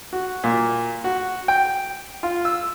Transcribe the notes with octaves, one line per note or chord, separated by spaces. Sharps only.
F#4
A#2
F#4
G5
F4
E6